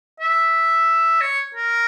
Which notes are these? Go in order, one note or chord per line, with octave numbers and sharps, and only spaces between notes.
E5
C#5
A#4